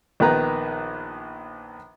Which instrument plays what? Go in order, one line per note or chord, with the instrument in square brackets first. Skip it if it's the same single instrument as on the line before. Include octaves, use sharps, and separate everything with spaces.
[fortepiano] A#1 D#3 B3 B4 A#5